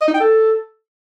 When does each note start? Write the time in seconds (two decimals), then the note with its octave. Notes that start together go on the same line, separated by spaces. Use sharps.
0.01 D#5
0.07 D#4
0.14 G5
0.20 A4